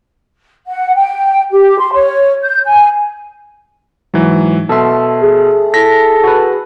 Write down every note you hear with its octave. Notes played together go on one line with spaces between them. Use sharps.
F#5
G5
G4
C6
C#5
G6
G#5
G#2 E3 F#3
B2 A4 E5 C6
G#4
E4 A4 A#6 B6
F#4 B4